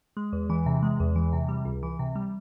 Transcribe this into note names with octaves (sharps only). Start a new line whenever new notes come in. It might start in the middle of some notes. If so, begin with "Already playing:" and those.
G#3
E2
E3
C3
G#3
E2
E3
C3
G3
C#2
E3
C3
G3